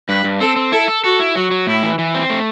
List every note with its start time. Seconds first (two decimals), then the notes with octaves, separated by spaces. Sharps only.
0.09 G2 B4
0.24 G2
0.40 C4 A4
0.56 C4
0.72 E4 A4
0.88 A4
1.04 F#4 A4
1.20 E4
1.35 F#3 F#4
1.51 F#3
1.67 A2 E4
1.83 E3
1.99 E3
2.15 C4
2.30 A3